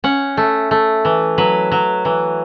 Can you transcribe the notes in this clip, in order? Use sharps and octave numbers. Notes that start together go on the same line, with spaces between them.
C#4 F#5
A3
A3
E3
F#3 B4
F#3
E3